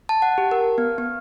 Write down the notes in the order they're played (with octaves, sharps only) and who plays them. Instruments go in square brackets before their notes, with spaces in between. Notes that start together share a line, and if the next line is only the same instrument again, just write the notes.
[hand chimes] A5
F#5
G4
A#4
B3
B3